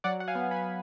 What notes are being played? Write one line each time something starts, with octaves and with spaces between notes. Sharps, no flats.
F#3 D5 F#5
F#5
F5 G#5
B3
G#5 B5